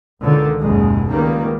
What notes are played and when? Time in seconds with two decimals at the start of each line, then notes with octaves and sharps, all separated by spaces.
0.22 C#2 D3 D#3
0.60 F#1 D#2 B2 G#3
1.08 C#2 D#3 G3 A#3 B3